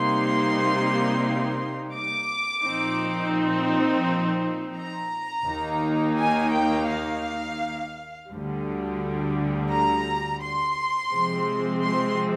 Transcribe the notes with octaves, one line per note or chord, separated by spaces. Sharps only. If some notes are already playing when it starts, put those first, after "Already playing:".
Already playing: C3 G3 A#3 D#4 C6
D6
A#2 F3 C4 D#4
A#5
D#2 D#3 A#3 D#4
G#5
G5
F5
D2 D3 G3
A#5
C6
C3 F3 G#3 C4
C6